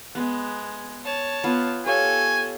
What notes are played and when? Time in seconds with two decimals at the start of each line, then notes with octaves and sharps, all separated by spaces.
0.15 G#3 B3
1.04 C#5 A5
1.44 B3 F4
1.86 G4 A4 C#5 F5 G#5